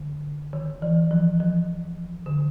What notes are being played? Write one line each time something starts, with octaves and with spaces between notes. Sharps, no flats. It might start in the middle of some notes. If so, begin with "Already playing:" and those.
Already playing: D3
D#3
E3
F3
F3
D3